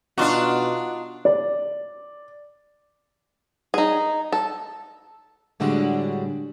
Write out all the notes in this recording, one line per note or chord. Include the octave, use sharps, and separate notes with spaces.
B2 D4 D#4 F4 F#4
D5
D#4 G#4
A4
A2 D3 G3 G#3 D4 F#4